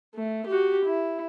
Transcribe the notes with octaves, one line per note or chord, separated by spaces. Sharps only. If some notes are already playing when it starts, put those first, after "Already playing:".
A3
F#4 G4
E4